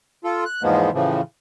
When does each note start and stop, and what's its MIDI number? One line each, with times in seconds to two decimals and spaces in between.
0.24 0.44 65
0.24 0.44 69
0.45 0.62 90
0.63 0.90 40
0.63 0.90 44
0.63 0.90 53
0.63 0.90 56
0.63 0.90 58
0.63 0.90 59
0.93 1.21 45
0.93 1.21 49
0.93 1.21 52
0.93 1.21 53